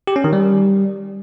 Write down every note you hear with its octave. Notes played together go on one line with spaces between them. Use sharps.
G4
C#4
D#3
G3